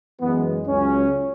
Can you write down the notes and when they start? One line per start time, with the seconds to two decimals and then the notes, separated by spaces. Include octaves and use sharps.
0.21 F#2 E3 G#3 B3
0.68 C#2 C#3 F#3 C#4